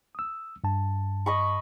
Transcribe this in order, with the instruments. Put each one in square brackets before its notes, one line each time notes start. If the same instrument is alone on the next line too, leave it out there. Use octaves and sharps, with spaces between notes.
[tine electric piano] D#6 E6
G2 A5
[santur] D#5 B5 C#6